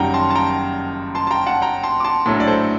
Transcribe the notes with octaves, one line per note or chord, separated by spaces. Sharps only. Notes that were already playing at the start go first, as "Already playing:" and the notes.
Already playing: F#1 F#2 D#3 G3 F#5 G5 A#5
A5 C6
A5
G5 A#5
A5 C6
A5
G5 A#5
F#5 A5
G5 A#5
A5 C6
D6
A5 C6
A#1 A2 F#3 A3
D5
A4 C5